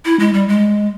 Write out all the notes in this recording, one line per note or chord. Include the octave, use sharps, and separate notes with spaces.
E4
G#3
G3
G#3